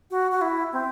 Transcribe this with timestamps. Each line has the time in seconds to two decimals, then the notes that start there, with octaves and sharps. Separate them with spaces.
0.11 F#4
0.32 F#4
0.41 E4
0.72 C4